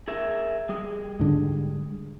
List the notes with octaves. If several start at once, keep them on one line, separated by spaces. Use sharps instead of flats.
G#4 A#4 E5
G3 G#4
G#2 D3